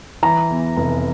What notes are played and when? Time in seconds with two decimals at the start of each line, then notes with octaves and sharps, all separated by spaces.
0.23 E3 A#5
0.50 E2
0.77 F1